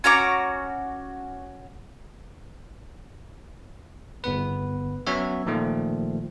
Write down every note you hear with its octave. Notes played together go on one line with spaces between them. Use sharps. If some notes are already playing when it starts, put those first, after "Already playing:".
C#4 F#4 A#5 D6
G1 B3 B4
F#3 B3 C#4 F#4 C#5 E5
A#2 D#3 F3 A3